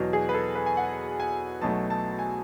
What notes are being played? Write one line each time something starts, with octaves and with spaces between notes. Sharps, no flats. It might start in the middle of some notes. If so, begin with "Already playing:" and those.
Already playing: E2 B2 F#3
G#4
B4
A4
B4
G#5
F#5
G#5
B1 B2 F#3 A3 A5
A5
G#5